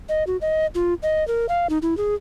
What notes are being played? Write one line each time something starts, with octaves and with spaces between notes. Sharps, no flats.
D#5
F#4
D#5
F4
D#5
A#4
F5
D#4
E4
G#4